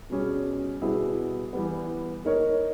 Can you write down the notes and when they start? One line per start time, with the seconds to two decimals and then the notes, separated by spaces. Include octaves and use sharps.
0.10 B2 G3 C#4 G#4
0.82 B2 G3 B3 E4 G#4
1.53 E3 G3 B3
2.25 A#3 D#4 A#4 C#5